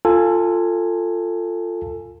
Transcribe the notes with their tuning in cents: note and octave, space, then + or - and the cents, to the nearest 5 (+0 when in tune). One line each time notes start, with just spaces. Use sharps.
F4 +0 A4 +20 G#5 +0